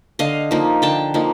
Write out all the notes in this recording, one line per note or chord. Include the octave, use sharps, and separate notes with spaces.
D3 D#5 F5
F3 A#3 D#4
D3 G5 A5
F3 A#3 D#4